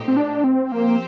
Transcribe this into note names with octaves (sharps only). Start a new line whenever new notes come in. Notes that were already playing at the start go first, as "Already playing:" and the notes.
Already playing: A#2 A3 D#4 G4 C5
C4
D4
C4
F3 A#3 C4 G4 C5